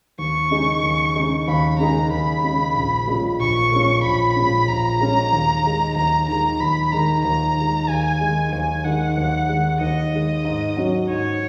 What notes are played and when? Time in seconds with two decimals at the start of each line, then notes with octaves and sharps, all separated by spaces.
0.19 D#2 C#6
0.51 C#3 G#3 D#4 G#4
0.83 D#2
1.16 C#3 G#3 D#4 G#4
1.48 D#2 B5
1.79 C#3 G#3 D#4 G#4 A#5
2.12 D#2 B5
2.44 C#3 G#3 D#4 G#4
2.76 A#1
3.07 A#2 G#3 C#4
3.40 A#1 C#6
3.72 A#2 G#3 C#4
4.04 A#1 B5
4.36 A#2 G#3 C#4
4.68 A#1 A#5
5.00 A#2 G#3 C#4
5.33 D#2
5.64 D#3 G#3
5.96 D#2 A#5
6.28 D#3 G#3 A#5
6.60 D#2 B5
6.92 D#3 G#3 A#5
7.25 D#2 A#5
7.57 D#3 G#3
7.88 D#2 G#5
8.21 D#3 G#3
8.52 D#2 G#5
8.85 D#3 G#3 F#5
9.17 D#2
9.49 D#3 G#3
9.81 D#2 D#5
10.14 D#3 G#3
10.45 G#2
10.77 F#3 C#4 F#4
11.09 G#2 C#5